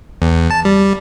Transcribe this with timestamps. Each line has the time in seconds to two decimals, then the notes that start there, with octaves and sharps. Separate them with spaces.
0.22 E2
0.51 A5
0.65 G3